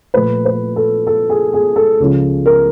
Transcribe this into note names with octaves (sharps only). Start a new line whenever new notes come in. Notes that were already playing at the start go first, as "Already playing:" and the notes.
A#2 F3 A3 B4
B4
A4
A4
G#4
G#4
A4
C#2 C#3 F3
A#4